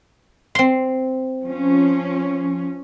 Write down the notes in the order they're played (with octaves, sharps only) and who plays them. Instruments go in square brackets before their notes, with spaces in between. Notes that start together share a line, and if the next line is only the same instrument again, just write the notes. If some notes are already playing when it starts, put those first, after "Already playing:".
[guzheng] C4 C6
[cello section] F3 C#4